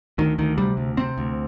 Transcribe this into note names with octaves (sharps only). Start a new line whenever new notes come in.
D2 D#3
D2 D#3
C3 G3
D2
C3 C4
D2